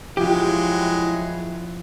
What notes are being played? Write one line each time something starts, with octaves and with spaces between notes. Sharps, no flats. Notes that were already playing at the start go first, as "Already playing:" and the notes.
F3 F#3 G#3 E4 F4 G4